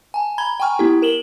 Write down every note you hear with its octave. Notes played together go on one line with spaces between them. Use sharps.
G#5 A5
A#5 B5 G#6 G7
G5 G#5 A#5 C#6 F6
B3 E4 G4
A#4 E7 F#7 G7